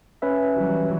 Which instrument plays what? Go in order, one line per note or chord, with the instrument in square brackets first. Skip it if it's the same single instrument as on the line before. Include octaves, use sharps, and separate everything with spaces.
[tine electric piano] C#4 B4 E5
[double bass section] E3 F#3 G3